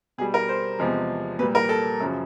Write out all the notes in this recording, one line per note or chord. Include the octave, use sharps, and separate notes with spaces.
B2 G3 G#4
A#4
C5
E2 C3 F3 G#3
A#2 G3 B4
A#4
A4
F#2 C#3 F3